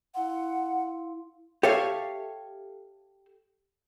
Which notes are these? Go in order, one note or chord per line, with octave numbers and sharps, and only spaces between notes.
E4 F5 F#5 C6
G4 A4 C#5 E5 F5